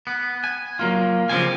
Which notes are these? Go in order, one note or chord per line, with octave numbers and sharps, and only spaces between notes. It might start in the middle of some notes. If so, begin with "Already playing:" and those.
B3
G#5
F#3 A#3 F4
C#3 F3 G3 A#3 F4 G#5